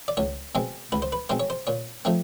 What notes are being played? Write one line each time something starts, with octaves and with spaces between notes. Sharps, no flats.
D5
C#2 C#5
B2 G#3 C4
C#2 B4
C5
B4
B2 G#3 C4 C5
C#5
C5
A#2 C#5
F3 A3 C4